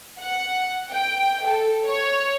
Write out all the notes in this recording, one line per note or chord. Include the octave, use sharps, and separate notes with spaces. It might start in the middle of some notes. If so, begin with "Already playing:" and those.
F#5
G5
A4
C#5